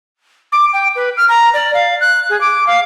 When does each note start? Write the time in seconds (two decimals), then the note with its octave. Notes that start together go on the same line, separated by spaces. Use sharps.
0.52 D6
0.73 G5
0.96 B4
1.17 F6
1.29 A#5
1.54 D5
1.74 F5
2.01 F#6
2.30 G#4
2.41 D6
2.67 F5